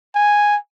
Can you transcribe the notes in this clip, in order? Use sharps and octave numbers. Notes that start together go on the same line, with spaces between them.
G#5